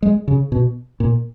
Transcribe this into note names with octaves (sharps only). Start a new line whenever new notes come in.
G#3
C#3
B2
A#2